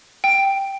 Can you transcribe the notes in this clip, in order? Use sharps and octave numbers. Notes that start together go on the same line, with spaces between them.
G5